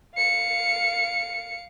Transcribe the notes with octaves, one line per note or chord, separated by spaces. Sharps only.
F5 C#7